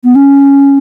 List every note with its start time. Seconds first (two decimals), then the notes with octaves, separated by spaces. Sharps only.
0.04 B3
0.15 C#4